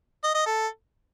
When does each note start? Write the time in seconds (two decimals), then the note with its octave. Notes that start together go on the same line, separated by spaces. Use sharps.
0.24 D#5
0.35 D#5
0.46 A4